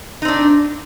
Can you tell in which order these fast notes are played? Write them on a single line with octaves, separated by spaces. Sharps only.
D#4 C4 D4